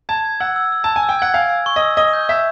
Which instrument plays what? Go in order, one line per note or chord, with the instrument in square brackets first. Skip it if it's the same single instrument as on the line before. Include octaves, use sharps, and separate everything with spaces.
[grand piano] A5 [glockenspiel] G#6
[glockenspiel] G#6
[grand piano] F#5 [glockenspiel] E6
[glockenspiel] E6
E6
[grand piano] A5 [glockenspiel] E6
[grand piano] G#5
[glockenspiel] E6
[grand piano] G5
[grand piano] F#5 [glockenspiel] G#6
[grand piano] F5 [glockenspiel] G#5
[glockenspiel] E6
C#6
[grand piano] D#5
[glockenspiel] E6
[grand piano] D#5 [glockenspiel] E6
[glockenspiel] G6
[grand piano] E5 [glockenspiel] E6